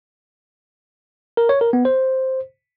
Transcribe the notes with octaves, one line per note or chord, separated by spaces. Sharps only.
A#4
C#5
A#4
B3
C5